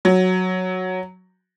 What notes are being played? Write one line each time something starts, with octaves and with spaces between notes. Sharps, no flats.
F#3